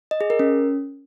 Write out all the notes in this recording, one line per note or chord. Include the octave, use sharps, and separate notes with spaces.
D#5
G#4
A#4
C#4